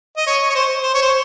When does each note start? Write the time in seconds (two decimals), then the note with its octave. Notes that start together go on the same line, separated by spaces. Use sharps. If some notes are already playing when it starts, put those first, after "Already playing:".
0.17 D#5
0.27 C#5
0.50 C#5
0.55 C5
0.83 C5
0.94 C#5
1.02 C5